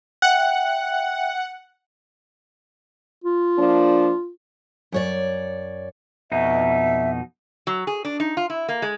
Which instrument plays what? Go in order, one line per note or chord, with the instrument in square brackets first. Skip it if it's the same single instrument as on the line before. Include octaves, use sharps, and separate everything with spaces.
[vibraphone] E5 G5 [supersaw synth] F#5
[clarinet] F4
[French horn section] F3 A#3 D4
[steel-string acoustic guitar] F#2 C#5 D5
[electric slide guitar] F2 B2 D#4 [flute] E5
[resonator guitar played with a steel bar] F#3
G#4
D4
D#4
F4
E4
A#3
G#3